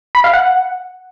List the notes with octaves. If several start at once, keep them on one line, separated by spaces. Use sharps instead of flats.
B5
F5
F#5